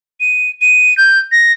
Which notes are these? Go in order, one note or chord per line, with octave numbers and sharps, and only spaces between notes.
D#7
D#7
G6
A#6